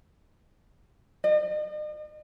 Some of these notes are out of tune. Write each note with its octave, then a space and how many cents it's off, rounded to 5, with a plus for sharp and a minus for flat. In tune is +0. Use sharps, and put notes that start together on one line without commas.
D#5 -45